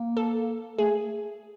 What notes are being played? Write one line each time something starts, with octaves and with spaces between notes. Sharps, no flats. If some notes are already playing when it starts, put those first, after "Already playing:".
Already playing: A#3
A4
A3 G#4